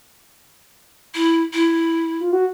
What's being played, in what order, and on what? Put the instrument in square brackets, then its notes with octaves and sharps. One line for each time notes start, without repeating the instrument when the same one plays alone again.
[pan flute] E4
E4
[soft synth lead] F4
F#4